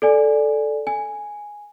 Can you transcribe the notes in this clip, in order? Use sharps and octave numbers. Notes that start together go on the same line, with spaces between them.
A4 D5 G#5
G#5